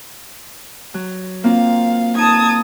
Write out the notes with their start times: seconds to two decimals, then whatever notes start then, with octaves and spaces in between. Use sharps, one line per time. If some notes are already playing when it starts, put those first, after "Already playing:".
0.94 F#3
1.44 A#3 C4 F4 F5
2.16 D#4 A5 D#6 G#6